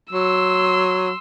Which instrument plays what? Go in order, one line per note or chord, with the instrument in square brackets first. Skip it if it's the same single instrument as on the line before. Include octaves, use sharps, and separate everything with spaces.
[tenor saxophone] F#3 [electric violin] C6 E6